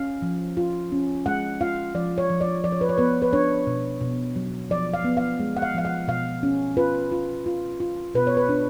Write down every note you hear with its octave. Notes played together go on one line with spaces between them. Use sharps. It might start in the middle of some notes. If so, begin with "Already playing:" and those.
Already playing: C#4 F5
F3
F4
C#4
G#3 F#5
F4 F5
F3 D5
C#5
F3
D5
F3 D5
C#5
B4
C#5
B3 B4
B4
D4 C#5
B2
B2
F#3
F3 D5
F5
B3
F5
G#3
F#5
F5
F3 F5
F#5
B2 F5
C#4
F4 B4
F4
F4
F4
B2 B4
C#5
B4
D4